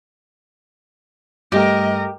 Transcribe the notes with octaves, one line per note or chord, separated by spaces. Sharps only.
G2 G3 A3 G4 A#4 D#5